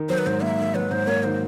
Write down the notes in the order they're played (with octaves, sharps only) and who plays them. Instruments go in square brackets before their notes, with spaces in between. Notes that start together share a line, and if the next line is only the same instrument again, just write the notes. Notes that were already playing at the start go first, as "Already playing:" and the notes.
Already playing: [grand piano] D#3
[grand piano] F#3 [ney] C5
[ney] B4
[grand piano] G#2 [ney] C5
[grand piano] A#3 [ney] E5
[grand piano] D#3
[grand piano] F#3 [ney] B4
[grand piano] G#2 [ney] C5
[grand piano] A#3 [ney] C#5
[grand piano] D#3 [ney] C5